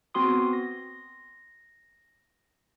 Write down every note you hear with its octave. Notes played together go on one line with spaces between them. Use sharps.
B3 C4 F#4 C6 D#6
A#6